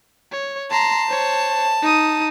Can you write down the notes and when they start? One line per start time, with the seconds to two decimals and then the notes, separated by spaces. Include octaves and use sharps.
0.32 C#5
0.71 A5 A#5 C6
1.08 C5 C#5
1.82 D#4 D#6